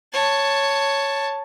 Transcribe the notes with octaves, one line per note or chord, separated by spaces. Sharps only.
C#5 A5